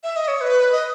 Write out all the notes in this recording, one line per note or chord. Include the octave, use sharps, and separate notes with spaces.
E5
D#5
C#5
B4
D#5